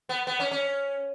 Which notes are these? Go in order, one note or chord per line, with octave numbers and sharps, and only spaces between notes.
B3
B3
C#4
C#4